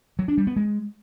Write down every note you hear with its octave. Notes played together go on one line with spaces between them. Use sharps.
F#3
D4
G3
B3
G#3